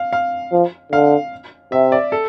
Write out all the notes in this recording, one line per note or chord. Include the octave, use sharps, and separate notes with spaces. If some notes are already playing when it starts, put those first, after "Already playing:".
Already playing: F5
F5
F3
D3 F5
C3 E5
D5
A4